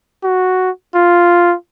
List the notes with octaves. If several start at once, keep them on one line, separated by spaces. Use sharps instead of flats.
F#4
F4